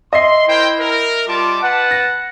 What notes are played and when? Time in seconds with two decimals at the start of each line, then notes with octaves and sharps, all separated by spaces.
0.13 D#5 E5 C6 C7
0.48 E4 A#4 C5 G5
0.80 A#4
1.28 G3 F4 A5 D6
1.63 B4 F#5 A5
1.91 A#6